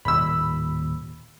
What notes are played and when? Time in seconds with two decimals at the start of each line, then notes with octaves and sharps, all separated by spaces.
0.05 D#1 A2 B5 E6